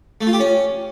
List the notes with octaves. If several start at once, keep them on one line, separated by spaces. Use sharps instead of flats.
A3
F4
G4
C#4